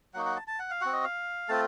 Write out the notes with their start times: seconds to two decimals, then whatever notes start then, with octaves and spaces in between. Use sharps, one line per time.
0.14 F#3 A#3 D#4 F#4 F#5
0.26 F#5
0.36 A5
0.48 A5
0.59 F#5
0.71 F5
0.81 C4 F#4 F#5
0.93 D#5
1.04 F5
1.49 A3 C4 F4 A5